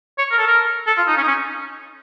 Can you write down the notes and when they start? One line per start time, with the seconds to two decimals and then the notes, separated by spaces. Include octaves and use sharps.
0.18 C#5
0.32 A#4
0.38 A4
0.47 A#4
0.87 A4
0.97 F4
1.07 D#4
1.17 C#4
1.23 D#4
1.28 C#4